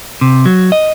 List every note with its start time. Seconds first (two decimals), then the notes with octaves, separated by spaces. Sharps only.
0.21 C3
0.46 F#3
0.72 D#5